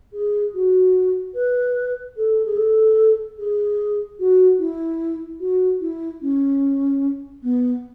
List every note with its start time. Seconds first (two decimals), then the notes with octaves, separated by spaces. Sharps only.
0.13 G#4
0.54 F#4
1.35 B4
2.17 A4
2.45 G#4
2.57 A4
3.39 G#4
4.20 F#4
4.59 E4
5.40 F#4
5.81 E4
6.22 C#4
7.43 B3